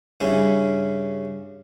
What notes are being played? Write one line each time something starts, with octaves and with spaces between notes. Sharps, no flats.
G2 C#3 C#4 E4